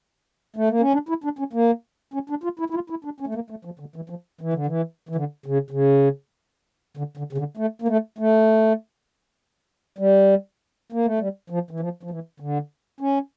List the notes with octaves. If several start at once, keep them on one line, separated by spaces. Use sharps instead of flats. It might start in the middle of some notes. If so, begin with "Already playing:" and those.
A3
A#3
C#4
D4
E4
D4
C#4
A#3
C#4
D4
F4
E4
E4
F4
E4
D4
C#4
A3
A#3
A3
F3
D3
E3
F3
E3
D3
E3
E3
D3
C#3
C#3
D3
D3
C#3
D3
A3
A#3
A3
A3
G3
A#3
A3
G3
F3
E3
F3
F3
E3
D3
C#4